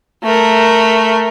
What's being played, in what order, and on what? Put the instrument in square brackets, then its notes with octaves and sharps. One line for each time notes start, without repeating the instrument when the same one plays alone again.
[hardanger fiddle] A3 A#4